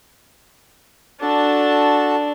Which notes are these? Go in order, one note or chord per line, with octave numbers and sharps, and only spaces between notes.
D4 F#4 A4 A5